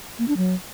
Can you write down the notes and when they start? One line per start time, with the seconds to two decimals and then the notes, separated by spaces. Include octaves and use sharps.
0.19 A#3
0.28 D4
0.37 F#3